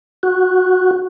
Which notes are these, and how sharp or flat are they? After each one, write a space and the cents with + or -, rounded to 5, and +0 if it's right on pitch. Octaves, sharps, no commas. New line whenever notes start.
F#4 -10